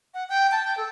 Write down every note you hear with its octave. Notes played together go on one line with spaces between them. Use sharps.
F#5
G5
A5
G5
A4